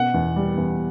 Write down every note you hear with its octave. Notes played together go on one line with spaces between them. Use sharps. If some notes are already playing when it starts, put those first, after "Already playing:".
Already playing: B2 F#5
E2
G3
E2